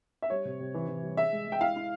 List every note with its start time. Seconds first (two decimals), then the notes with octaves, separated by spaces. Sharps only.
0.22 E5
0.30 G3 C#5
0.45 C3
0.60 C3
0.74 E3
0.88 E3
1.03 G3
1.17 G#4 E5
1.32 G#3
1.47 G#3
1.52 G5
1.60 E4 F5
1.76 E4